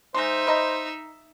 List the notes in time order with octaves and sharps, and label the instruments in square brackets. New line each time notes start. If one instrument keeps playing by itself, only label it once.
[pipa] G#3 C6 [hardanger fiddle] D#4 E5 [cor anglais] C5
[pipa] B4 D#5 A#5